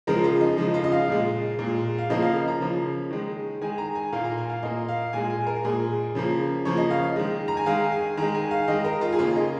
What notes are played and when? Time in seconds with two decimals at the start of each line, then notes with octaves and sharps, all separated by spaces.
0.07 C#3 F3 G#3 A#4
0.24 F4
0.41 D#4
0.57 C#3 F3 G#3 D#4
0.74 F4
0.84 D#5
0.92 F5
1.08 A#2 G#3
1.59 A#2 G#3
1.98 F5
2.09 C#3 F3 A#3 D#5
2.22 F5
2.48 A#5
2.60 C#3 F3 A#3
3.11 D#3 G#3
3.61 D#3 G#3 G#5
3.78 A#5
3.95 G#5
4.13 A#2 A#3 F5
4.24 A#5
4.37 G#5
4.50 F5
4.63 A#2 A#3 D#5
4.88 F5
5.13 A#2 G#3 G#5
5.30 G#5
5.47 A#4
5.65 A#2 G#3 G#4
6.15 C#3 F3 A#3
6.65 C#3 F3 A#3 C#5
6.77 D#5
6.91 F5
7.16 D#3 G#3
7.48 A#5
7.57 G#5
7.66 D#3 G#3 F5
7.92 G#5
8.17 D#3 G#3 A#5
8.35 G#5
8.51 F5
8.68 D#3 G#3 D#5
8.84 A#4
9.01 F4
9.13 G#4
9.19 C#3 A#3 F4
9.36 D#4